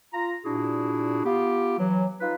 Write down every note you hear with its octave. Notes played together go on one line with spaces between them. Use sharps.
F4 A#5
A#2 D4 E4 F#4 G#4
B3 F4 G4
E3 F#3
D#4 F4 B4